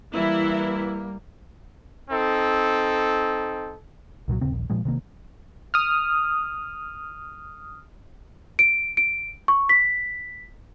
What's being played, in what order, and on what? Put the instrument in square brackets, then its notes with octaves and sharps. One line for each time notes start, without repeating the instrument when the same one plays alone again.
[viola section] E3 E4 [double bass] G3 A#3
[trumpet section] C4 D#4 A4
[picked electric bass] C2 A#2 F3 F#3
D#1 C#3 C4
D#1 A#1
A#2 F3 G#3
C3 D#3 A#3
[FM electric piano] D#6 F6
[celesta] D7
D7
C#6
B6